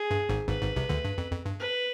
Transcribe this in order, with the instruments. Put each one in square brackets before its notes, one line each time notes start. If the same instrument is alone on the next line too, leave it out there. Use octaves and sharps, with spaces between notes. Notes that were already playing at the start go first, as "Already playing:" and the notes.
Already playing: [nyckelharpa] G#4
[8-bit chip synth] G2
G#1 G#2
[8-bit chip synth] G#1 G#2 [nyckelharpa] B4
[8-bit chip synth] G#1 G#2
C2 C3
D2 D3
G2
F2
F2
G2
[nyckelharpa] B4